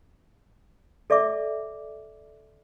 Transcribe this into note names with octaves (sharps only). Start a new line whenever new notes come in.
A4 D5 E5 D6